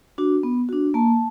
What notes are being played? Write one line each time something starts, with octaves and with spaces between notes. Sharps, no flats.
D4 F#4
B3
D4 F#4
A#3 A5